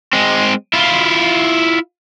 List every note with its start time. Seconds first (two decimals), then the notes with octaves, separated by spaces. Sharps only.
0.13 G#3 C4
0.73 E4 F4